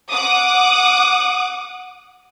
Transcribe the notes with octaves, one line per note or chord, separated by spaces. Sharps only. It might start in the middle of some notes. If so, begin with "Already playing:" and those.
F#5 D6 D#6